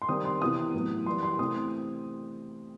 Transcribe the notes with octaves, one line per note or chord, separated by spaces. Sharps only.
C6
D#3 G3 C4 D#6
C6
C3 E3 B3 D#6
A2 F#3 B3
E3 G3 B3 C6
C6
C3 E3 A3 C4 D#6